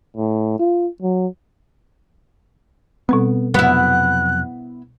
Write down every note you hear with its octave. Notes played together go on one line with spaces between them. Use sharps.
A2
F4
F#3
B2 G3 B3 C4
F2 C3 F#3 B3 E4 F#6